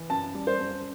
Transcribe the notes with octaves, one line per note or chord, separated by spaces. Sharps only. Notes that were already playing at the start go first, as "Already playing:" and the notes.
Already playing: E3
F#2 A5
G3
C5
F#2